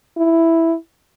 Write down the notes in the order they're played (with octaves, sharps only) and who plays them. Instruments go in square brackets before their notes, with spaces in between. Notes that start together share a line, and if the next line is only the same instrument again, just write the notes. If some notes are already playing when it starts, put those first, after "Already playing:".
[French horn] E4